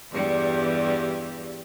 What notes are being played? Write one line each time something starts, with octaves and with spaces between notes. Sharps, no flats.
E2 G2 G3